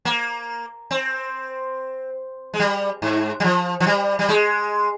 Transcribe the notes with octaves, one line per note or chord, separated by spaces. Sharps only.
A#3
C4
G#3
G3
G#2
G3
F3
F3
G3
G3
G#3